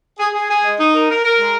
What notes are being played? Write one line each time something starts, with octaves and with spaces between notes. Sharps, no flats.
G#4
G#4
G#4
G#3
D#4
A#4
A#4
A#4
G#3